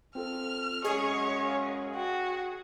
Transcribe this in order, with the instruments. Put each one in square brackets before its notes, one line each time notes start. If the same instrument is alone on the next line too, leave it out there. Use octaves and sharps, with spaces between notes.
[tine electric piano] C4 F4 A4 [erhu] F6
[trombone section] F#2 G#3 C#4 [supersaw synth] G#4 [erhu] C#5 [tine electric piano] D#5
[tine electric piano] F5
[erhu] F#4 [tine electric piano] G5